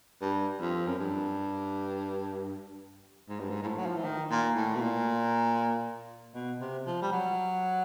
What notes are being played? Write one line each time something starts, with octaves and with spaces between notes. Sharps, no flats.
G2
F2
F#2
G2
G#2
G2
G#2
G#2
A2
F#3
F3
E3
D#3
A#2
A2
B2
A#2
B2
C3
F3
G3
F#3